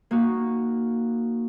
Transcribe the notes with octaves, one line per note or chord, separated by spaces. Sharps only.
A#3 D#4 F#4